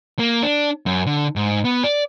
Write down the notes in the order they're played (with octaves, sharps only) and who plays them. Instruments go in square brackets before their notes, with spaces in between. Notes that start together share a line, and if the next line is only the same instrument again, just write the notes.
[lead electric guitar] A#3
D4
F#2
D3
G#2
B3
D5